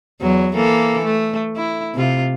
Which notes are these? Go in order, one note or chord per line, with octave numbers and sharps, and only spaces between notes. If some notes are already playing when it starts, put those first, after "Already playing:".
E2 F#3
E3 A#3 A4
A3
E4
C3 F4